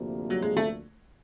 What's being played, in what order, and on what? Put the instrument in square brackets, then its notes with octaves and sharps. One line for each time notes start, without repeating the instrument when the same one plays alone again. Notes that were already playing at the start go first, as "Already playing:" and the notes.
Already playing: [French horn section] D2 C3 F3 A#3
[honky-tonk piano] F#3
G#3
A3